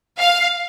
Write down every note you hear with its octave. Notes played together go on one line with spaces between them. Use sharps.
F5